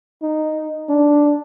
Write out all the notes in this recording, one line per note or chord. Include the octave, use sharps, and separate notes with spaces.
D#4
D4